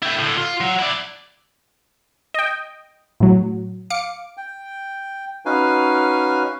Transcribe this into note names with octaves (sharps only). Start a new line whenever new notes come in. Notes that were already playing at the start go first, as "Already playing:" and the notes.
E4 G5
A2 D3
F4
F#3
E4 D5
D#5 G5
A2 F#3
F5 D6 C#7
G5
C#4 D#4 F#4 B4 F5 G#5